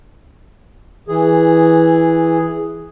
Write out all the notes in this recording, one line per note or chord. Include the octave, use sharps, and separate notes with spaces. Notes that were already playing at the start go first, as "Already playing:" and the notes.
E3 G#4